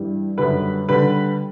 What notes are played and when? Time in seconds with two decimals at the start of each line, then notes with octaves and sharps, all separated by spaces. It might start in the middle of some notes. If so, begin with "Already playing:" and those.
Already playing: G2 E3 G3
0.38 F#2 D3 G3 B4
0.89 D3 G3 B4